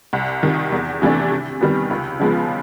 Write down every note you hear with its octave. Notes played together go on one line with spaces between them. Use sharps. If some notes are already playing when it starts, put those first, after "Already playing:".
C2
C3 D#3
E2
C3 E3 A3 D4
C3
D#3 G3 B3
C#2
C#3 F3 G#3 B3